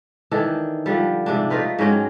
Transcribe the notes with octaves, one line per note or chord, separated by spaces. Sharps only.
D#3 E3 D4 A4
D3 F3 G3
G#2 C3 D4
A3 D#4 F4 B4
G#2 F#3 C#4 G5